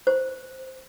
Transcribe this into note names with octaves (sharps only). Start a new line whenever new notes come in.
C5